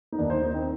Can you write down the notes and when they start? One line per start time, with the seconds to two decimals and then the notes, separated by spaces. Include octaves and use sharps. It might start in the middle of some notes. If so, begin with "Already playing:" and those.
0.12 D#4
0.18 D#2 D#3 A#3 D4
0.30 C5
0.42 D#4
0.54 C4